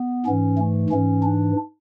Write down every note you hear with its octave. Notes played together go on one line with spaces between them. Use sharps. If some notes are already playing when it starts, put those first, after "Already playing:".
Already playing: B3
G#2 E3 C#4
A3
G#2 E3 C#4
D4